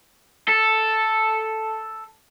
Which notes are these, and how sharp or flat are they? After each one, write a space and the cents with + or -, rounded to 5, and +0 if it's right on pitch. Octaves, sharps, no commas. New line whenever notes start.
A4 +0